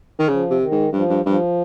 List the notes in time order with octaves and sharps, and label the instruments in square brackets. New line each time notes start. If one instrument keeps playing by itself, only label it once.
[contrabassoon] D#3
[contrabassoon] C#3 [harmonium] F3
[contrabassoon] C3
[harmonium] D#3
[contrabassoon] G#2
[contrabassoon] G2 [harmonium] F3
[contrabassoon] G2
[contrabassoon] G2 [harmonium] F3